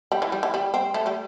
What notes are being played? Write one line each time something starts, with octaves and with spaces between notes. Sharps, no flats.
G3
E3
G3
E3
G3
C4
A3
G3